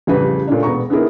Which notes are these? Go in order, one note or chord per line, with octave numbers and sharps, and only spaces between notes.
A1 F2 C#3 G3 B4
A#2 A3 C#4 D4
E1 B3 A#5 C#6
B3 C#4 D#4 E4 G#4 A#4